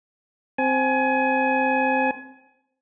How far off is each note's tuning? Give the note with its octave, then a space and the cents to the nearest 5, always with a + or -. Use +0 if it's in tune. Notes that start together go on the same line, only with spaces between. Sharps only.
C4 +0 G#5 +25